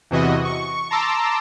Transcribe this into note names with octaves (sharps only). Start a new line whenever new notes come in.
E2 C3 E3 F#4 D#5
C#6
A5 A#5 C6 D6 E6